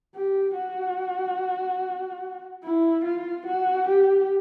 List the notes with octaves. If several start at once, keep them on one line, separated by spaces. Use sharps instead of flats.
G4
F#4
E4
F4
F#4
G4